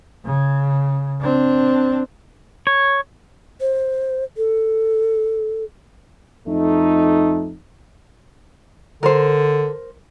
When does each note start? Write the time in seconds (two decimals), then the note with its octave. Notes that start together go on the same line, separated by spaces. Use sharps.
0.25 C#3
1.21 C4 D4
2.67 C#5
3.61 C5
4.37 A4
6.47 F2 A3 D#4
9.03 D3 A#4 C5